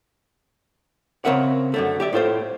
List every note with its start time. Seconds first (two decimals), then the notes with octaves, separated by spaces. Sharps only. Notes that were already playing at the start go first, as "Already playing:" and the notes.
1.25 C#3 C4 A#4 E5 F#5
1.74 F#2 D3 A3
2.00 G4 D5 E5
2.13 A2 F4 A4 C5